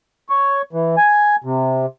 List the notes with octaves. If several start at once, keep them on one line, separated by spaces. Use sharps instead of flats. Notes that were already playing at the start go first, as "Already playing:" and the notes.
C#5
E3
G#5
C3